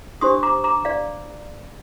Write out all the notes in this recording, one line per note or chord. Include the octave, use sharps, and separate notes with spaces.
D4 G4 C5 C6 D#6
A#5 D6
A#5 D6
D5 F5